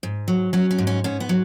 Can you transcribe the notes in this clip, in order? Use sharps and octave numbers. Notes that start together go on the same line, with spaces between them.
G#2
F#3
F#3 C#4
C#4
G#2
C#4
G#2 C#4
B3
F#3